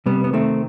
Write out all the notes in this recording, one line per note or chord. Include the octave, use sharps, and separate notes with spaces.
C3 G3 B3
B3
D#3 A3 C4